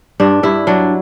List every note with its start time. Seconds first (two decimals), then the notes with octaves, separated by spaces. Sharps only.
0.20 G2 D4
0.43 G2 E4
0.67 F#3 D4